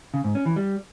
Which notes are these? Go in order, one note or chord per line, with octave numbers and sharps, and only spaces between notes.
C#3
G#2
C#4
E3
G3